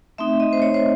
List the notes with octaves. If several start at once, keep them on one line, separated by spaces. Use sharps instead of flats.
A3 C4 D#4 E5
D#5
C5
C#5
C5